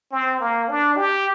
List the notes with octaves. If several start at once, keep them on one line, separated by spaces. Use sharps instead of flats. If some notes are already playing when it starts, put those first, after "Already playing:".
C4
A#3
D4
G4